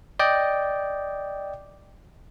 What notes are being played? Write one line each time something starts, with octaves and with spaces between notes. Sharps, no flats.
D5 D#5 G5